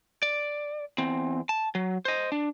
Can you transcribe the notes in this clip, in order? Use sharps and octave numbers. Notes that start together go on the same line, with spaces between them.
D5
E2 C4
A5
F#3
C5 D#5
D4